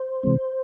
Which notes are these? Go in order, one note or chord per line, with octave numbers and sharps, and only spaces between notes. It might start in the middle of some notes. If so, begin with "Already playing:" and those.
Already playing: C5
C3 E3 G#3 C4